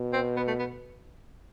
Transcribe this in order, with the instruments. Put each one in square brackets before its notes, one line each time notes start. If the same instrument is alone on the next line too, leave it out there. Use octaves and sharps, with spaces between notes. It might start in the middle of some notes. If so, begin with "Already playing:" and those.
Already playing: [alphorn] B2
[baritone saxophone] C4
B3
A3
B3